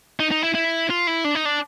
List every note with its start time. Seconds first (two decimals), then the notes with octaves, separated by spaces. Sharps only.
0.20 D#4
0.31 D#4
0.43 E4
0.55 E4
0.90 F4
1.07 E4
1.25 D4
1.35 D#4
1.45 D4